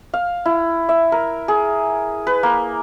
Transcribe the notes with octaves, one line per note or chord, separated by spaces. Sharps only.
F5
E4
E5
A#4
G#4
B4
A#3